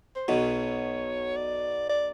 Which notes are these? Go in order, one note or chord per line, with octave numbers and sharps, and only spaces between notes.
C5
B1 B2 C#5
D5
D5